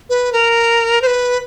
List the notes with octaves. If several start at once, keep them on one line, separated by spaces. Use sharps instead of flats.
B4
A#4
C5
B4